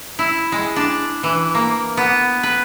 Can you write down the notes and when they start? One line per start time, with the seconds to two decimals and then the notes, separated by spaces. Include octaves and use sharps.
0.19 E4
0.52 G#3
0.76 D4
1.23 E3
1.55 A#3
1.97 B3
2.43 B4